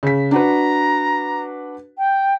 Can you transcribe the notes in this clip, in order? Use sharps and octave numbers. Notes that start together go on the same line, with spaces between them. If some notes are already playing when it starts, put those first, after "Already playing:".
C#3 B6
D4 F#4 B4 A#5
G5